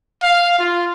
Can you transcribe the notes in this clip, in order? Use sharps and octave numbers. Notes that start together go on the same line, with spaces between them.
F5
F4